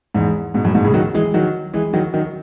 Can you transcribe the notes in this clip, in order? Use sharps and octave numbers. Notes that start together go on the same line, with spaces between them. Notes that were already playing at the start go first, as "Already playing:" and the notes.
E2 G#2
G#2 B2
F#2 A2
G#2 B2
A2 C#3
D#3 F#3
E3 G#3
D#3 F#3
E3 G#3
D#3 F#3
D#3 F#3